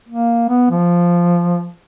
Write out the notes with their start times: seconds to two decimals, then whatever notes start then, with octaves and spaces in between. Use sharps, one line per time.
0.09 A#3
0.49 B3
0.71 F3